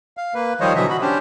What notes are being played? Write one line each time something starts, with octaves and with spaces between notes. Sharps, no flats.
F5
A#3 B4
D#3 F3 G3 C5 C#5 D#5
B2 D3 E3 F#3 D#5 E5
F#4 B5
C#4 D4 G4 C5